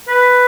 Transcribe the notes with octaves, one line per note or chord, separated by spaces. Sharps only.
B4